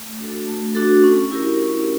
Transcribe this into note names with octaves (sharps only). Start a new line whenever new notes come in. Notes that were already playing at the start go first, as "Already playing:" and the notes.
Already playing: A3
D4 F#4 A4
A3
D4 F#4 A4
C#4
E4 G4 A#4
C#4